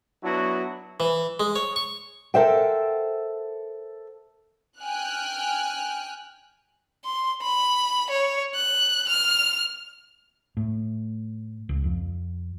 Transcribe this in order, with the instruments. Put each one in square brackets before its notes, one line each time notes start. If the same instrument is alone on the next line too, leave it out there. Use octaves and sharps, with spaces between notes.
[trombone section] F#3 B3 D4 E4 F#4
[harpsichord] E3
G#3
C#5
C#6
[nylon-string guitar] A4 A#4 C5 E5 F#5 G5
[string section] G5 G#5 F6 F#6
[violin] C6
B5
C#5
F#6
F6
[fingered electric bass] A2
C#2
F2